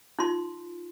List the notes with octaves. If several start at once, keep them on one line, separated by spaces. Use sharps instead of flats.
D#4 F4 C6